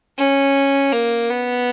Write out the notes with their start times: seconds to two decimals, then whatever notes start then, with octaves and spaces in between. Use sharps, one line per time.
0.18 C#4
0.92 A#3
1.30 B3